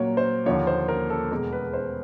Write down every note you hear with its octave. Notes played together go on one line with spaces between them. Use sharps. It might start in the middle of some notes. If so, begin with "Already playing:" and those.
Already playing: A#2 F#3 A#3 C#5
C5
D#2 D3 F3 A#3 C#5
C5
A#4
A4
E2 B2 G#3 A#4
B4
C5